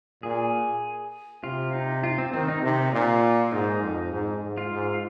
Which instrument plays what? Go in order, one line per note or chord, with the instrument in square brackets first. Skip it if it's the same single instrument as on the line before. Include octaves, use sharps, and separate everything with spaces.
[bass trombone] A#2 [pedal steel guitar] G#4
[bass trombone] C3 [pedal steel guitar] F4
[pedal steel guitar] D#4
F4
C4
[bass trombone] D#3 [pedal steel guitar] C4
[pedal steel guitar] D#4
[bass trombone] C3 [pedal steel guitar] D#4
[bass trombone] A#2 [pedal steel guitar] F4
[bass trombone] G#2 [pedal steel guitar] D#4
[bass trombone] F2
G#2
G#2
[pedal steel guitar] F4
[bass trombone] G#2